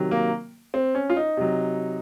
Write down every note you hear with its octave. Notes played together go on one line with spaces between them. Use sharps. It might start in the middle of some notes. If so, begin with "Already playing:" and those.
Already playing: C3 D#3 F#3
A#3
C4
C#4
F4
D#4
C3 F#3